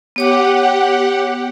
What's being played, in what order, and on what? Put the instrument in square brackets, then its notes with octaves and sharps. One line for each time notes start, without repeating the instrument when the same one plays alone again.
[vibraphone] B3 C#5 D6 [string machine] G4 F#5